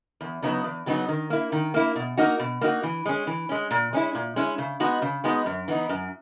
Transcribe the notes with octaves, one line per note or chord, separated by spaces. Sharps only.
E2
C#3 F#3 B3 D#4
E2
C#3 F#3 B3 D#4
D#3
A#3 E4
D#3
A#3 E4
B2
A#3 D#4 F#4
B2
A#3 D#4 F#4
E3
G#3 C#4
E3
G#3 C#4
A#2
G#3 C#4 E4
A#2
G#3 C#4 E4
C#3
G#3 B3 D#4 F#4
C#3
G#3 B3 D#4 F#4
F#2
E3 B3 D#4
F#2